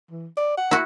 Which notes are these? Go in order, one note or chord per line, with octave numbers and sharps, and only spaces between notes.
E3
D5
F#5
E4 F#4